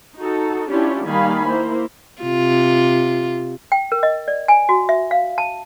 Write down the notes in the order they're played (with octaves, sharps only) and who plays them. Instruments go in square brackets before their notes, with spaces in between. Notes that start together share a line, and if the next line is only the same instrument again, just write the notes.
[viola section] D#4 F#4 A4
C#4 D4 E4 F4 G4 C#5
D#3 G3 A#3 F5 G#5 B5
A#3 E4 C5
[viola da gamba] C3 F4
[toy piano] G5
A#4
D#5
D5
G#5
F#4
E5
F5
A5